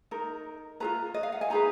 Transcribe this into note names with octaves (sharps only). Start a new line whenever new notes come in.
D#4 A#4
F4 G#4 B4 A#5
D#5
F5
F#5
G#5
D#4 G#4 B4 A#5